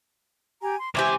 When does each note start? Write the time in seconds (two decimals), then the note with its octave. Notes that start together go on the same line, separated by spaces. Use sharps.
0.62 G4 G#5 A#5
0.79 C6
0.95 C#2 E3 C4 G4 E5 G#5 D6